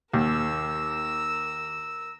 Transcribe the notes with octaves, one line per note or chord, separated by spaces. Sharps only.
D#2 A#4 E6